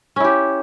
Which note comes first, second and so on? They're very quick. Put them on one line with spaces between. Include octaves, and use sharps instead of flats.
C#4 E4 G4